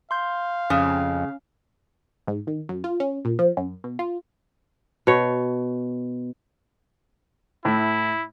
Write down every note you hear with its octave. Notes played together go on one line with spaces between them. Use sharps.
F5 C6 G6
F2 C#3 C#4
G#2
D#3
F#2
F4
C#4
A#2
F3
F#2
B2
F4
B2 C#5
A2 E4